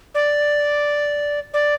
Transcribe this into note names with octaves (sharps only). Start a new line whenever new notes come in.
D5
D5